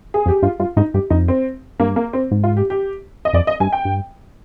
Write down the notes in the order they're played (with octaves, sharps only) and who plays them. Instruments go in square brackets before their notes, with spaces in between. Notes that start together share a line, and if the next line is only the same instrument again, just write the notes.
[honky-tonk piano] G#4
[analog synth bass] F2
[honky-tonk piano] G4
[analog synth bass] G2 [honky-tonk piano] F4
[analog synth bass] G2 [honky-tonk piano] F4
[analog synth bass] G#2 [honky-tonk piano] D#4
[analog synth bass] G2 [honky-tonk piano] G4
[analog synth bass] F2 [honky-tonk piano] D#4
[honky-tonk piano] C4
[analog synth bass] G2 [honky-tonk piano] A#3
[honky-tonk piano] A#3
C4
[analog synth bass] G#2
[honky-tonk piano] F4
G4
G4
D#5
[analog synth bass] F2 [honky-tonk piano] D5
[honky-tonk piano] D#5
[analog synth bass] G2 [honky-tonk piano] G#5
[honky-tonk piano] G5
[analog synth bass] G2